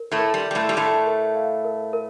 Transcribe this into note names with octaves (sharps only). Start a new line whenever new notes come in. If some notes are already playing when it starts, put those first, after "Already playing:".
Already playing: A#4
A2 A3
A#4
G3
G3 A#5
A2 A3
G3
A2 A3 A#4
A#4
F5
A#4
A#4